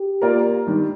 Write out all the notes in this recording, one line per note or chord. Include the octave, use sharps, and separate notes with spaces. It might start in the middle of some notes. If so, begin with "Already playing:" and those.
Already playing: G4
A#3 F4 A#4 D5
D#3 G3 D4